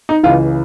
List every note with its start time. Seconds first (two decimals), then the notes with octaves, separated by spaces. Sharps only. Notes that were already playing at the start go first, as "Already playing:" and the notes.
0.09 D#4
0.23 C#2 C#3 E3 F4